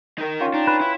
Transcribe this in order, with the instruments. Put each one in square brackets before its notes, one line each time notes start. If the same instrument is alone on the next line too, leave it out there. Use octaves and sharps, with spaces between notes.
[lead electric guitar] D#4 A#4
[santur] C#4 F4 G5
[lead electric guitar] D4 [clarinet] D#4
[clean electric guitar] B4
[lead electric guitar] E4